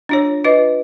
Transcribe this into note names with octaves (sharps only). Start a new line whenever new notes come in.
D4 F4 C#5
F4 B4 D#5